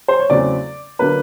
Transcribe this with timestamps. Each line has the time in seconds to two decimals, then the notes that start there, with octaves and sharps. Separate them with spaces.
0.08 C5
0.19 C#5
0.30 E2 C#3 F#3 A3 C4 D5
0.99 D3 F#3 A#3 B4